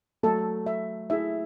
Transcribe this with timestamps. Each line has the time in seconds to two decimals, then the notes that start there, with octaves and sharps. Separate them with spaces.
0.23 F#3 A3 A4
0.67 E5
1.10 E4 G#4 E5